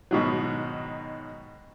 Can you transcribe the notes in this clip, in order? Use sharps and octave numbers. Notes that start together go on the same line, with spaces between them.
G#2 B2 D#3 F#3